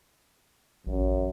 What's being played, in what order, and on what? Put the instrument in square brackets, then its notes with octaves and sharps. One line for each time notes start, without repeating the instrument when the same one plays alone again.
[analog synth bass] A1 [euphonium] F#2